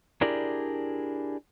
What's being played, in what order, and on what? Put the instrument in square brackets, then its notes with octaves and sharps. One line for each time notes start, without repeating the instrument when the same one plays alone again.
[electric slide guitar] D4 E4 G4 G#4 A#4 D5